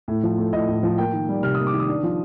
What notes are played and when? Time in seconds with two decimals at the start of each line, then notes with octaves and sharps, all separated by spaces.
0.08 A2
0.23 F3
0.38 A3
0.53 A2 D#5
0.68 A2
0.83 F3
0.98 A#3 G5
1.13 D#3
1.29 G3
1.43 C3 F6
1.55 A#3 D#6
1.67 D6
1.74 D#3
1.80 D#6
1.89 D4
2.03 F3